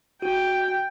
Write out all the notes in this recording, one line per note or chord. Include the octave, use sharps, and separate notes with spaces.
F#4 G5